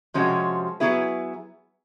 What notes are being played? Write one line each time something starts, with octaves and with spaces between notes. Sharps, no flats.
C3 F3 G#3 C#4 F#4
F#3 B3 E4 G#4 B4